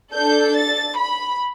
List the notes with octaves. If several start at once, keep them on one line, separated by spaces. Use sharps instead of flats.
D4 A4 G6
A6
B5